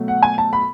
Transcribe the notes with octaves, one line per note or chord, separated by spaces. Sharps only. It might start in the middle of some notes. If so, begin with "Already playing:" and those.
Already playing: B2 F#3 A3
F#5
G#5
A5
B5